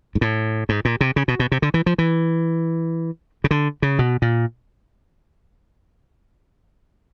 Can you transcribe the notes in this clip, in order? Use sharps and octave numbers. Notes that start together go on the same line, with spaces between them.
G#2
A2
G#2
A#2
C3
C#3
B2
B2
C3
D3
E3
F3
E3
C#3
D3
C#3
B2
A#2